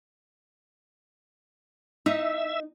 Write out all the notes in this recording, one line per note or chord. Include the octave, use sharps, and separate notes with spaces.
D#4 E5